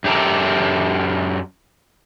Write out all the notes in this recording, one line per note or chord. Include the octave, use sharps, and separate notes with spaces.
F#2 G4 A4 A#4